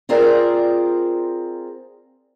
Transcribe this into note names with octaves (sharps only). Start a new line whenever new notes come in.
C4 F4 G#4 A#4 C5 D5